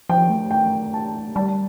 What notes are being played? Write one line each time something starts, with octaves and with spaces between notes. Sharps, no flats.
F3 G5
A3
G5
A5
G3 A5